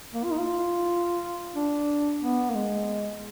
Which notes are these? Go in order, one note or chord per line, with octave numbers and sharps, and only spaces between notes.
A#3
F4
D#4
F4
D4
B3
A#3
G#3